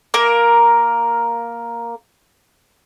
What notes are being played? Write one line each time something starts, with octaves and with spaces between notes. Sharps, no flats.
A#3 A#4